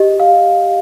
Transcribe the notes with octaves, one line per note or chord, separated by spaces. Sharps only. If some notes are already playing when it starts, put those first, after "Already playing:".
Already playing: G4 D#5
F5